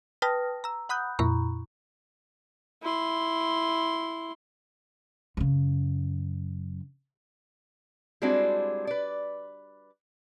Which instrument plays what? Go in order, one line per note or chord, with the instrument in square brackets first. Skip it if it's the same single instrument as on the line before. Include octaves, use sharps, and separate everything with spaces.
[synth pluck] B4 G5 A5 D#6 F6 A#6
A#5 E6
F#5 B5 D#6 F#6 G6
F2 A#2 E4 A#5 B5 C#6
[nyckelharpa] E4 C6
[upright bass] F#2 C#3
[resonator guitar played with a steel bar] G3 G#3 C4 D4 E4 F#4
B4 D5